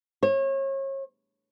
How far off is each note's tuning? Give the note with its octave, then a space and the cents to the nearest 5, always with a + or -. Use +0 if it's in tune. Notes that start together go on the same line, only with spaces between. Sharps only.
C#5 -35